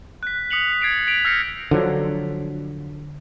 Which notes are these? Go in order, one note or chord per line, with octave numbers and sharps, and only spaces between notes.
F#6 B6
D#6 B6 C#7 F7 F#7
G#6 A6 C7 D7 F7
B6 D7 F7
E6 F6 G6 A#6 C7 C#7
D3 F3 F#3